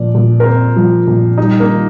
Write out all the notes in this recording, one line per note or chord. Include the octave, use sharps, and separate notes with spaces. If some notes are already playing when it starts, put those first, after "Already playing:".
Already playing: A#2 F3 D5
A#2
A#4
C4 C5
F3
A#2
G3 D#4
A#3
D#3